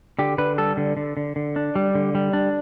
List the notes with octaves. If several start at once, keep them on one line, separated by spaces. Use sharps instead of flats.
D3 G4
D3 B4
G3 A4
D3
D3
D3
D3
D4
G3
D3
G3
D4